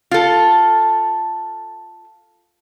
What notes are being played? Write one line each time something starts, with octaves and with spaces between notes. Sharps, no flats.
F4 A4